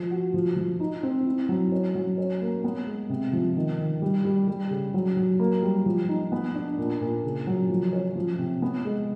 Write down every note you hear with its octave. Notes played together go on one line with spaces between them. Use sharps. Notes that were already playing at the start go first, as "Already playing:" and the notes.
Already playing: F3
F#4
F3
F3
D#4
C4
E4
F#3
C#4
F#3
C#4
A#3
B3
G#3
C3
F3
D#3
D#3
G3
G3
G3
C#3
F#3
F#3
A#3
G3
F3
D#4
B3
D4
A#2
A#2
C#3
F#3
F3
C#4
F3
C3
B3
G#3